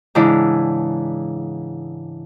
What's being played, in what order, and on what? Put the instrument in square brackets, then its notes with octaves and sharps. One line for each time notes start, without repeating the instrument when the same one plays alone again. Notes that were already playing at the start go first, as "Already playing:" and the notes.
[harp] G#2 C#3 E3 D4 E4